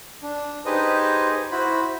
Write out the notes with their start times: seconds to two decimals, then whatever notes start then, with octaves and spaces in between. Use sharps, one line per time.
0.22 D4
0.65 D#4 G4 G#4 B4 C5 D#5
1.52 E4 F#4 C5 B5